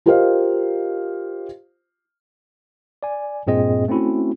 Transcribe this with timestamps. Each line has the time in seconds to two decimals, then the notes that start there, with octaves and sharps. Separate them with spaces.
0.06 F4 G4 A#4 C5 D#5 F5
3.03 D5 G#5
3.47 G2 A#2 C4 G#4 D#5
3.88 A3 C4 C#4 E4 F#4